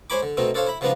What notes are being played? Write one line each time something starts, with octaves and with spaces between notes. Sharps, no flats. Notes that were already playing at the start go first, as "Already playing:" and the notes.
G#3 C5 C#5 G#5 B5 D6
D3
B2 A3 C4 D#4
D4 A4 C5 C#5 F5 A5
E4 B5
C#3 F3 G#3 B3 D4 D#4